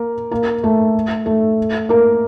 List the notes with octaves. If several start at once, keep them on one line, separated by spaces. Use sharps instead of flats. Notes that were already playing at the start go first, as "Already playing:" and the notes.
Already playing: A#3 A#4
A#3 A#4
A3 A4
A3 A4
A#3 A#4